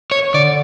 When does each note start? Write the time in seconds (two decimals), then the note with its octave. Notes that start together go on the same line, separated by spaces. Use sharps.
0.11 C#5
0.34 D3 D5